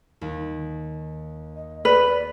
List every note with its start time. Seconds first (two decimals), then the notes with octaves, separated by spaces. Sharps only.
0.21 D#2
1.56 D#5
1.85 B4 D5